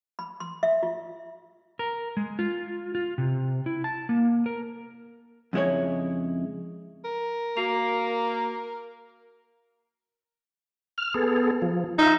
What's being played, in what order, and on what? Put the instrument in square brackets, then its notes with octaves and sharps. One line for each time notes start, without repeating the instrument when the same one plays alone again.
[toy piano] B5
C6
E5
F4
[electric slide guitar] A#4
G#3
F4
F4
C3
E4
A5
A#3
A#4
[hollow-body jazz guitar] F2 C#3 G#3 E4 C#5
[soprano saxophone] A#4
[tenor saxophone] A#3 [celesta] F#4 C7 F7
[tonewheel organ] F6
B3 G#4 A4
F3
[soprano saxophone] D#4 [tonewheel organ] F4 E5